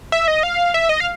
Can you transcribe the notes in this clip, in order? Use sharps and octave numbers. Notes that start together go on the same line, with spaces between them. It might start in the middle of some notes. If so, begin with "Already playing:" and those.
E5
D#5
F5
E5
D#5
F5